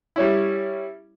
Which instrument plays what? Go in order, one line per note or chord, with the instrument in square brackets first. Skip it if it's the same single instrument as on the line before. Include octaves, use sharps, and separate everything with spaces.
[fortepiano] G3 C#4 E4